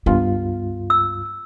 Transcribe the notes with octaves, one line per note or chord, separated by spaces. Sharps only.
C#2 G2 B3 F4
E6